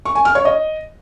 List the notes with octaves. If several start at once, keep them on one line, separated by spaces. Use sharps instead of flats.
C#6
G#5
F6
C#5
D#5